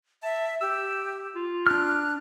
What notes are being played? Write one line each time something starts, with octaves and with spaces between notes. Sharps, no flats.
E5 A5
G4 E6
F4
D4 F6 F#6